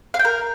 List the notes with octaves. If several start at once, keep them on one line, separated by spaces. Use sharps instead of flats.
F5
G5
A#4